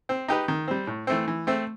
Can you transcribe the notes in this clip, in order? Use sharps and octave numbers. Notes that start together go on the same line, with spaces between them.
C4
D#4 G4 B4
D#3
G3 C4
A2
E3 A3 C4
E3
A3 C4